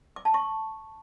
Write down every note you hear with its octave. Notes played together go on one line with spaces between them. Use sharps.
D6
A5
C#6